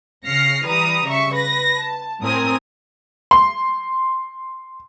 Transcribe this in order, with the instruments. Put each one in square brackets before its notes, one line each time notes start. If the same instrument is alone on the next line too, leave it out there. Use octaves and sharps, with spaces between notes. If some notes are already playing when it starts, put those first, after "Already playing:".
[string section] C#3 F6 A#6 C7 C#7
E3 G3 B4 A#5 D#6
C#3 E5 C#6
B4 A#6
A5
A2 C4 A#4 G#5 D#6
[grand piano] C6